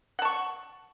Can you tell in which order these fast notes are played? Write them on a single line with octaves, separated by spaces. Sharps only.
F#5 A5 C#6